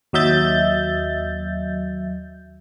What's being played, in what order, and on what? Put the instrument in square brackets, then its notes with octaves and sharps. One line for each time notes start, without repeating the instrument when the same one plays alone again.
[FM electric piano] D#2 F#3 D#5 E5 G6 A6